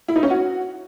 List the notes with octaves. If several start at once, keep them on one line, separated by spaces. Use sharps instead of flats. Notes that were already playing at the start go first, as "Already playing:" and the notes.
E4
D#4
C#4
F#4